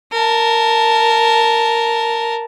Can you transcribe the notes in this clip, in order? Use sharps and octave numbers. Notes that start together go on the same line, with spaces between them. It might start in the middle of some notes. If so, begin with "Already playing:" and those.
A#4 A5